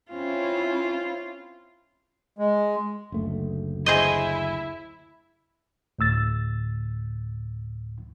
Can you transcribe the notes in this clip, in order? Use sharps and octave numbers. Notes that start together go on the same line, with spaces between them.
C4 C#4 E4 F4
G#3
F#1 D2 A3
E4 G#4 C5 D#5
D2 A2 E6 A6